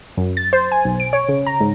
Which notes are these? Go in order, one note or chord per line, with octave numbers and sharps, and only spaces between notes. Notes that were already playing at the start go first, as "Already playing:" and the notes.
F#2
A6
C5
G#5
B1
D7
C#5
C#3
A#5
G#2